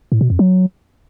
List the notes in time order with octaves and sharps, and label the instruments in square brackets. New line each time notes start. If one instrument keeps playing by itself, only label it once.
[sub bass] A2
B2
F2
F#3